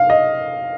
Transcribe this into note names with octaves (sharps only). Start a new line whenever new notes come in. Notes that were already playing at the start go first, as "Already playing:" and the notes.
Already playing: F5
D#5